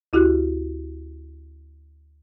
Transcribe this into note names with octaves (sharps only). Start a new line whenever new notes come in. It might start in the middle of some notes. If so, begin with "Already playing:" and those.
D2 E4 F#4 G4 F#6